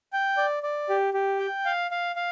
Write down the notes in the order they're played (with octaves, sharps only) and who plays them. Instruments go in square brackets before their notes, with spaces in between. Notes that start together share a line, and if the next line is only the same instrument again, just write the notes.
[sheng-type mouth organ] G5
D5
D5
G4
G4
G5
F5
F5
F5